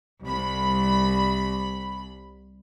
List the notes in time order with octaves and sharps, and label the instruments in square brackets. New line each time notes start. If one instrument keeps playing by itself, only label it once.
[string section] C2 B5